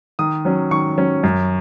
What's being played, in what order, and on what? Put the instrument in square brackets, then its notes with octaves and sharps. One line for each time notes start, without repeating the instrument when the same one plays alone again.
[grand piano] D#3 D#6
F#3 C#4
D#3 C#6
F#3 C#4
F#2